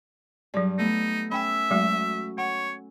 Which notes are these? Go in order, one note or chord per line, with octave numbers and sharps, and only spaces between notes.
G2 F#3 D5
A3 B3 D#4
C#4 E5 G5 B5 E6
F#3 G#3 A3 F#4
C#5 F#5